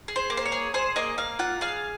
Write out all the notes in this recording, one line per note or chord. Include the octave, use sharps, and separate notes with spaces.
G#4
C5
A#3
C5
C#5
G#4
G#4 C5
A#3 D#5
A#3 F5
F4 F#5
G#4 F5